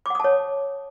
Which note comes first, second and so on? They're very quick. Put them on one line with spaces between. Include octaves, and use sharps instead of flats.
D6 F#5 D#6 A5 C#5